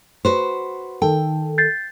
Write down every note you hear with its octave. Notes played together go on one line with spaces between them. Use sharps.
F#4 B4 C5
D#3 A4 G5
G6 A6 C7